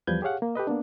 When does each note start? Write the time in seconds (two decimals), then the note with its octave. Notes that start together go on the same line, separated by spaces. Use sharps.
0.07 E2 F3 G3 B4 G6 G#6
0.22 G4 G#4 C#5 F5 F#5
0.42 A#3
0.55 G4 A4 B4 D#5
0.67 A#3 B3 D4